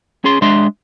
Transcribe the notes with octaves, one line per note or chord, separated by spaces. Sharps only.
C#4 G#4 C6
G#3 D4 E5 C6